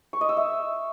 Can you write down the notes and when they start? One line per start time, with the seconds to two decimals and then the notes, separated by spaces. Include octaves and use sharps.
0.13 C#6
0.21 D#5
0.29 E6
0.37 E5